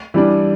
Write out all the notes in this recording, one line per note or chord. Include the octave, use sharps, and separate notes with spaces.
E3 G3 D4